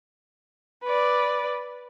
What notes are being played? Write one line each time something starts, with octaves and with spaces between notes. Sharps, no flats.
B4 D5